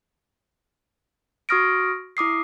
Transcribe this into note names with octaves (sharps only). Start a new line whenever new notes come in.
F#4 C#6 D#6 F6 A#6 D7
E4 D6 D#6 C7